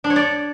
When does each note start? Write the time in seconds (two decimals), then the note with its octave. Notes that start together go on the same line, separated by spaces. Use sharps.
0.04 D4
0.10 C#5
0.16 D5